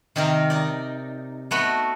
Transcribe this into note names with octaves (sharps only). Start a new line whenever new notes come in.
C3 D#3 D#4 G4 A#4
D#4 D5
A3 B3 F#4 D#5 B5